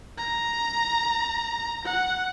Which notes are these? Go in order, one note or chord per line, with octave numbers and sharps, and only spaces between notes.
A#5
F#5